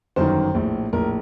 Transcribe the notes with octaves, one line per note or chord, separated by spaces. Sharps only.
G1 F#2 D#3 C5
A#1 A2
A#1 A2 A#4